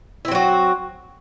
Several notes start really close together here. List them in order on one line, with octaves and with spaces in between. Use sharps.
E4 C4 F#3 F#4